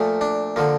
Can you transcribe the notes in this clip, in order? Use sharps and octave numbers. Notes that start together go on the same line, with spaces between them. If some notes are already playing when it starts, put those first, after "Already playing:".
Already playing: A#2 F3 A3
D4
D3 F3 A#3